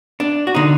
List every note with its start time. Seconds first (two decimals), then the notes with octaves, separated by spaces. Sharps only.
0.20 D4
0.47 F#4
0.55 D3 D#4